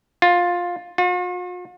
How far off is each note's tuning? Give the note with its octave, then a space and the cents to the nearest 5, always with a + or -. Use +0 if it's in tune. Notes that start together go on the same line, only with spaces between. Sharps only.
F4 +10
F4 +45